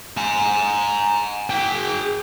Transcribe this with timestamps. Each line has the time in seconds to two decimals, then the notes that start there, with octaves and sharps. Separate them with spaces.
0.17 G#5 A#5
1.50 G#4 G5